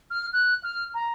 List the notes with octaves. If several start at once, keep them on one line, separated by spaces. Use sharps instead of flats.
F6
F#6
F6
A#5